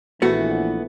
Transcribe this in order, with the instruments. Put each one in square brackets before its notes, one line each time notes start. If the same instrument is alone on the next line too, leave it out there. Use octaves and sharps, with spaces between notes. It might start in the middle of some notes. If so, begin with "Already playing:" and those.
[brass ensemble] A#1 E3 [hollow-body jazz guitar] A3 B3 F#4